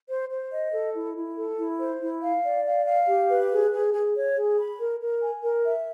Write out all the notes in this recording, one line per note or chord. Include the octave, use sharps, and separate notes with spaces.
C5
C5
D#5
A4
E4
E4
A4
E4
C5
E4
F5
D5
F5
F5
G4
B4
G#4
G#4
G#4
C#5
G#4
B5
A#4
A#4
G#5
A#4
E5